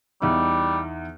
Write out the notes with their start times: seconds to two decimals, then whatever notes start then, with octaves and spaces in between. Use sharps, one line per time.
0.22 E2 G3 D#4